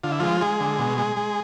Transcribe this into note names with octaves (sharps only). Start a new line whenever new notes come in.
D3 F4
E4
F3 G#3 F4
G#3 G#4
D3
B2
G#3
G#3